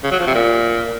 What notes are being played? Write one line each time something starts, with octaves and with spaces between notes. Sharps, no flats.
C#3
F#3
F3
C3
A#2